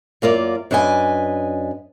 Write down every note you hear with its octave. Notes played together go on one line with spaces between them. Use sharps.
F#2 A#3 F4 D5
F#2 D4 B4 D#5 G#5